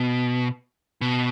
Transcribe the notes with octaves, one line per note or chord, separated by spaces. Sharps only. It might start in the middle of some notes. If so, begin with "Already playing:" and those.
Already playing: B2
B2